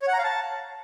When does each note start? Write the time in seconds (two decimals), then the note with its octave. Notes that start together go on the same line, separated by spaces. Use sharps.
0.02 C#5
0.08 F#5
0.13 A#5
0.18 F5
0.24 A5